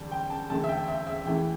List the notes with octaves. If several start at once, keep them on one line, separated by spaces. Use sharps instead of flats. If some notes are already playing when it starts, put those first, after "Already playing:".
Already playing: E2 D3 G3 A5
G5
A5
E2 D3 A3 A5
E5
G5
E5
E5
E2 E3 A3 G5